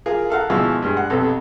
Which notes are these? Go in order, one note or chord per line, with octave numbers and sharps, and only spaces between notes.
F4 G#4 A#4
A4 F5 F#5 A#5
B2 E3 F3 G#3 E5 C#6
G2 G#3
F#5
B1 F2 C3 A4 B4